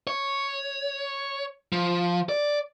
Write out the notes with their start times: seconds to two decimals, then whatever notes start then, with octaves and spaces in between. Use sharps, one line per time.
0.07 C#5
1.72 F3
2.29 D5